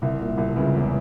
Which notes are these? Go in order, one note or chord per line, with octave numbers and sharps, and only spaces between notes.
C2 C3
A#2
C2 C3
C#2 C#3
E2 E3